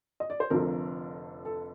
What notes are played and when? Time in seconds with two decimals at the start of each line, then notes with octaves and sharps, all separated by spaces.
0.20 D#5
0.30 D5
0.40 C5
0.50 F1 F2 D3 F3 A#4
1.45 A4